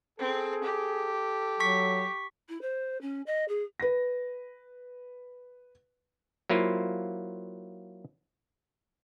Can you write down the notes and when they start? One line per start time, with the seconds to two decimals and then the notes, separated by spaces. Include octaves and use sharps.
0.19 C4 G#4 A4
0.64 G4
1.60 F#3 C#6 B6
2.48 E4
2.61 C5
3.01 C#4
3.26 D#5
3.48 G#4
3.80 B4 A#6
6.50 F#3 A#3 E4 F4 C5